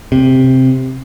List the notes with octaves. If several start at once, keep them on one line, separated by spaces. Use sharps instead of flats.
C3